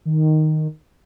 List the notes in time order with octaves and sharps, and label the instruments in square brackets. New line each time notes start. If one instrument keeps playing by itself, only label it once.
[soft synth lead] D#3